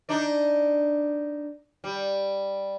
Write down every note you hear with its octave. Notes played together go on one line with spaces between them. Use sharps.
D4 D#4 D5
G3